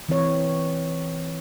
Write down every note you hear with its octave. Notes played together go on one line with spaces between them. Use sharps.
E3 C4 C#5